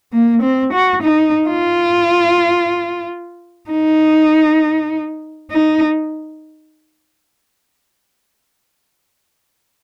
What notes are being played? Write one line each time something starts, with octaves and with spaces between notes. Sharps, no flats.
A#3
C4
F#4
D#4
F4
D#4
D#4